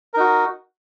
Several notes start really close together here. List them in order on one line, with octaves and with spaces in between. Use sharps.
A#4 D#4 F#4